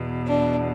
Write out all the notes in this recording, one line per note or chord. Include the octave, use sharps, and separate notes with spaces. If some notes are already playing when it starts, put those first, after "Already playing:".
Already playing: E2 B2
D4